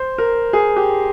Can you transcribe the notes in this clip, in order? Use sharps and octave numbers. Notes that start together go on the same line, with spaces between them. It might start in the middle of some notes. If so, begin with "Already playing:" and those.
Already playing: C5
A#4
G#4
G4